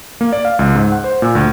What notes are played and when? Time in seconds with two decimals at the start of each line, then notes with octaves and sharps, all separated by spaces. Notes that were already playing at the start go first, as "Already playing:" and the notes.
0.21 A#3
0.32 D5
0.45 F5
0.59 C#2
0.75 G#2
0.92 F#5
1.04 C5
1.22 A#2
1.35 D2